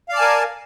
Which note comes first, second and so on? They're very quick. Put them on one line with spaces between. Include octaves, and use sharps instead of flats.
F5 D5 A5 G#5 A#4